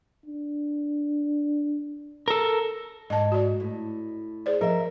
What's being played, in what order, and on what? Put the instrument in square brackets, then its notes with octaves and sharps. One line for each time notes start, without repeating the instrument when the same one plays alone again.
[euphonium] D4
[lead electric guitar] A4 A#4
[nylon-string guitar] G#2 [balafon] D#5 A5
[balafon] F#4 D5
[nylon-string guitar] A2
[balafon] G#4 C5 D5
[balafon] F3 [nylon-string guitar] A#4 E5